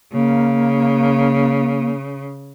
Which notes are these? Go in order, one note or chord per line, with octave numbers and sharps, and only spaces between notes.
C#3 A#3